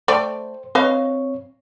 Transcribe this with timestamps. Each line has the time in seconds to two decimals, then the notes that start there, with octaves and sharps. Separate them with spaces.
0.08 A3 C5 D5 G5
0.75 C4 B4 C#5 D#5 F5